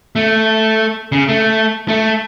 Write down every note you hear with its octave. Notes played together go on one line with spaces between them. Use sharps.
A3
C#3
A3
A3